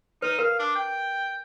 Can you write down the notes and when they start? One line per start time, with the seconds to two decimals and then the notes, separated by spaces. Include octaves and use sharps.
0.22 D#4 B4
0.39 A#4 F5
0.59 D4
0.76 G5